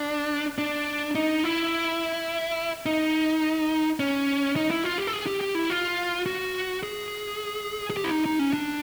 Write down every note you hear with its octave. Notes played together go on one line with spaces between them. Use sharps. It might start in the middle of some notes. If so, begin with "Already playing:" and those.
Already playing: D4
D4
D#4
E4
D#4
C#4
D#4
E4
F4
G4
A4
G#4
G4
G4
E4
F4
F#4
G#4
G#4
G4
E4
D#4
D#4
C#4
D4